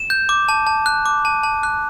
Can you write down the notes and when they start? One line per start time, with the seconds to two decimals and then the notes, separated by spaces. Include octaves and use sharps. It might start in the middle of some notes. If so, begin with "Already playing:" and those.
Already playing: E7
0.10 G6
0.29 D6
0.49 A5
0.67 A5
0.86 F#6
1.06 D6
1.25 A5
1.43 A5
1.63 F#6